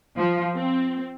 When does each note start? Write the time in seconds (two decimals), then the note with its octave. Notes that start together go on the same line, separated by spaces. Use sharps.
0.17 F3
0.55 C4